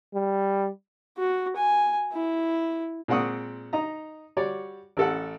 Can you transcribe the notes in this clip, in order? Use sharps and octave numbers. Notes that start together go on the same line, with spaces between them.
G3
F#4
G#5
E4
A#2 G#3 C4 F#5 C#6 D#6
D#4 D#5 A#5
G3 F#4 C#5 D5
A1 A4 F#5